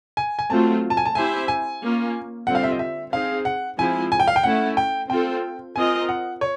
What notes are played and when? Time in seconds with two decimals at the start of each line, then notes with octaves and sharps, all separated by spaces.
0.17 G#5
0.39 G#5
0.50 F#3 A3 C4 F4 A5
0.90 A5
0.97 G#5
1.05 A5
1.15 C4 E4 G4 C5 E5 G#5
1.48 G#5
1.82 A#3 C#4 F4
2.47 D3 G3 C4 F4 F#5
2.55 F5
2.63 E5
2.71 D#5
2.79 E5
3.13 C4 D#4 G#4 F5
3.45 F#5
3.78 F3 G#3 C4 E4 G#5
4.12 G#5
4.20 G5
4.28 F5
4.36 G5
4.43 A3 C#4 E4 F#5
4.77 G5
5.10 C4 F4 A4 G5
5.76 C4 F4 A#4 D#5 G#5
6.09 F#5
6.41 C#5